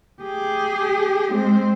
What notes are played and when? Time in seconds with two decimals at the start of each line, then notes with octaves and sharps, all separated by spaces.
0.23 G4 G#4
1.33 G#3 C4